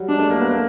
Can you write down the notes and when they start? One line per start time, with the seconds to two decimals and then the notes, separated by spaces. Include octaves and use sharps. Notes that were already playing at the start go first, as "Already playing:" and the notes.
Already playing: F#3 G3
0.08 G#3 D4
0.20 A3
0.30 A#3
0.40 B3
0.51 A#3